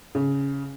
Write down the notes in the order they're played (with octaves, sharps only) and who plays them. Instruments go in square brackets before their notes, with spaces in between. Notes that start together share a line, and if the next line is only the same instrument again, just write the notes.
[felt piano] C#3